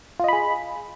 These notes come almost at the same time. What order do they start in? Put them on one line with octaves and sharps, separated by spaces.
F4 D#5 B5 G#4